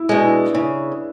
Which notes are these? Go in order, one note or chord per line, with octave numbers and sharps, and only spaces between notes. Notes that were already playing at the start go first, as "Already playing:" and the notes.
Already playing: E4
B2 G#3 D4
E4
C#3 E4